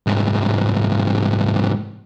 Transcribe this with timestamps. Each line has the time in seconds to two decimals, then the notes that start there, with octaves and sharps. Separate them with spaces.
0.07 C2 G#2